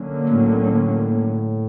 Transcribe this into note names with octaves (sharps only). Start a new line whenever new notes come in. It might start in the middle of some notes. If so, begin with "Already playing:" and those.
Already playing: D3 F#3 A#3 C#4
A2